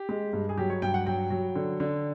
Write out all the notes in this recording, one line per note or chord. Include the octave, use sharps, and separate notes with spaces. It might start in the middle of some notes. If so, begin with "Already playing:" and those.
Already playing: G4
G#3
G2
G#4
F#3 G4
C#5
G2 G5
F#5
F#3 G5
F#3
D3
D3